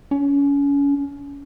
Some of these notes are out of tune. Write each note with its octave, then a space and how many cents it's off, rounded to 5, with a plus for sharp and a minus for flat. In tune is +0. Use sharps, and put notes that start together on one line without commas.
C#4 +30